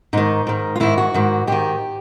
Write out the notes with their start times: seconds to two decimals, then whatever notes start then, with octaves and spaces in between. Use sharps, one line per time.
0.13 G#2 D#3 D#4
0.47 G#2 D#3
0.76 F4
0.80 G#2 D#3 E4
0.98 F#4
1.14 G#2 D#3
1.47 G#2 D#3 G4